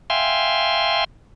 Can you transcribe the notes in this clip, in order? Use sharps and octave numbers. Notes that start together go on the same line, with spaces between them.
E5 F5 G5 G#5 C6